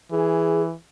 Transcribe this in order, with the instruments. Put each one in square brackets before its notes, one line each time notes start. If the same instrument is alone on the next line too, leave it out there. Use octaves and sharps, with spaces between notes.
[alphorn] E3 [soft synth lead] G#4